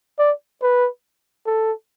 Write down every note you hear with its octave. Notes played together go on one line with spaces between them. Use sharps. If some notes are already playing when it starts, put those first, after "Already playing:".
D5
B4
A4